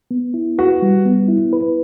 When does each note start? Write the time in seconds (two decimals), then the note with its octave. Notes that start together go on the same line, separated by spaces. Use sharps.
0.11 B3
0.34 E4
0.58 F#4 B4
0.82 G3
1.05 B3
1.28 E4
1.53 B4